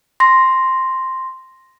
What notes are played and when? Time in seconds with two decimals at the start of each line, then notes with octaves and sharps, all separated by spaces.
0.20 C6 A#6